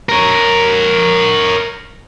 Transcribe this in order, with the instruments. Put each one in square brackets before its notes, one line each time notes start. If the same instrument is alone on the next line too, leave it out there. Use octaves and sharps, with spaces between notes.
[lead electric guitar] A#4 C#5